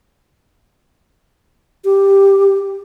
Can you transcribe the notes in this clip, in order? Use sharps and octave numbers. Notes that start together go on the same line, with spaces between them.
G4